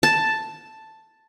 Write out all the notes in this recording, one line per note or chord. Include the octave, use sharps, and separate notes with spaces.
A5